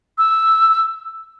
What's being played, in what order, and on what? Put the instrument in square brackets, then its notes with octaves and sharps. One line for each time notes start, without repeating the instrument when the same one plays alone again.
[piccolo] E6